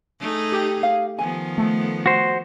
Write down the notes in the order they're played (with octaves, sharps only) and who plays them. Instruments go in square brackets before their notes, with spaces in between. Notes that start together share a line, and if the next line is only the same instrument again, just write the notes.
[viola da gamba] A3 D#4 G#4
[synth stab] G4
[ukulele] F5
[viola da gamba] D#3 F3 B3 [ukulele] G#5
[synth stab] A3
[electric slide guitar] F#4 C5